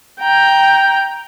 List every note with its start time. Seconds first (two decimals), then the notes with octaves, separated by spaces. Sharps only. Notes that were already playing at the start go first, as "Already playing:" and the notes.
0.21 G5 A#5